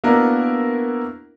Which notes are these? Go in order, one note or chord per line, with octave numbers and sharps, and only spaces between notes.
A#3 B3 D4 E4 F#4 A#4